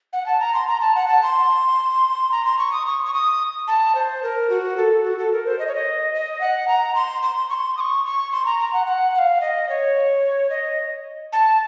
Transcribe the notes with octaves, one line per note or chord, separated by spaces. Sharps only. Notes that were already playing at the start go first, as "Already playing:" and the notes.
F#5
A5
A#5
C6
A#5
A5
F#5
A5
C6
A#5
C6
C#6
D#6
C#6
C#6
D#6
A5
C5
A#4
F#4
A4
F#4
A4
A#4
C5
D#5
C#5
D#5
D#5
F#5
A#5
C6
C6
C#6
C6
D#6
C#6
C#6
C6
A#5
A#5
F#5
F#5
F#5
F5
D#5
C#5
D#5
A5